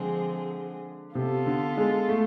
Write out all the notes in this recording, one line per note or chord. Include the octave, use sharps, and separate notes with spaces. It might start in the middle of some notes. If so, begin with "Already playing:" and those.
Already playing: D3 F3 G#3 C4 G#4
C3 B3 F4 A4
D3
G#3
A3